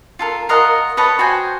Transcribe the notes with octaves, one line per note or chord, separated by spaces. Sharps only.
F4 A4 A#4
F4 A#4 D#5 F#5
B4 C#5 D#5 A5
F#4 C5 G5 G#5